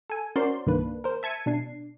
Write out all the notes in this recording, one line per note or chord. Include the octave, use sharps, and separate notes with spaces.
A4 G#5
C#4 F#4 A#4 C5 D5 C6
C2 G2 D#3 A#3 D4 B4
A#4 C5
E5 A5 G#6 C#7 D#7
B2 D4 C7